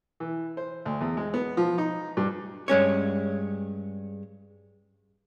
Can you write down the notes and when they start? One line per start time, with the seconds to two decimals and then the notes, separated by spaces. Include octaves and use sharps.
0.20 E3
0.57 C5
0.85 D2
1.01 E2
1.17 G#3
1.34 B3
1.57 F3
1.78 D#4
2.17 G2
2.68 G2 G#3 C#4 C#5